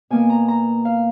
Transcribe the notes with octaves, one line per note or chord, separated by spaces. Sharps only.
B2 A#3 G#5
A#5
A#5
F5